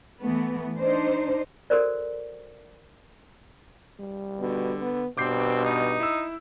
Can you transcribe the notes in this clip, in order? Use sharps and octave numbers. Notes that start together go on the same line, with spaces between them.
E3 A3 B3
D4 D#4 C5
F#4 A4 A#4 C5 D5
G3
B2 D3
B3
G2 B2 C4 D6 G6 C7
D#4
E4 E6